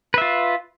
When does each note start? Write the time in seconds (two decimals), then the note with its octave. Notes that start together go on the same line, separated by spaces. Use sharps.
0.14 B4
0.18 E5
0.21 F4